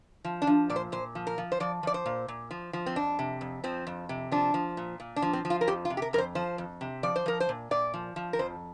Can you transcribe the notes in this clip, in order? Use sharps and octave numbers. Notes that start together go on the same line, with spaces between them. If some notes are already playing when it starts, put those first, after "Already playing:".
F3
D4
F3
A#2 D5
C5
A#2 C5
F3
A#4
F3
C5
F3 D5
F3 D5
C5
A#2
A#2
F3
F3
C4
F2 D4
C3
F2
F3 C4
F2
C3
F3 D4
F3
A#2
A#2
D4
F3
C4
F3
F4
A#4
F2 G4
F4
C3
G4
A#4
F2 A#4
C5
F3 C5
F2
C3
F3 D5
C5
F3 A#4
C5
A#2
A#2 D5
F3
F3
A#4
F2 C5